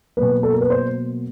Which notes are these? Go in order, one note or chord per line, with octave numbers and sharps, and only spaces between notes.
B2 F#3 A#3 B4
A4
A#4
B4
C5